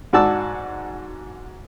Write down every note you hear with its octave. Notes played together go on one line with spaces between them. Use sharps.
G#2 F#4 D5 A5 E6